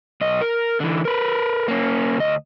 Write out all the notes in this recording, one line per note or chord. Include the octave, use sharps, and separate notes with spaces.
B1 D#5
A#4
D3 E3
A#4 B4
A#3 C#4
D2 D#5